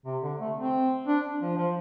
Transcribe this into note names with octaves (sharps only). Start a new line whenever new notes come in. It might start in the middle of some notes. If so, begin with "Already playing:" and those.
C3
D3
A3
C4
D4
F3
F3